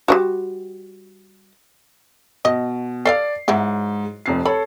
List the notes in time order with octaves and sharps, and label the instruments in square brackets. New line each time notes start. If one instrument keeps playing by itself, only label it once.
[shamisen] G3 F4 F#4
[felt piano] B2 [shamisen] D#5
[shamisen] A4 E5 F5 [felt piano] D5 C7
[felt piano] G#2 [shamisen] F#3 E4
[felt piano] F1 F2 C7
[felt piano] A4 C#5 [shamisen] B5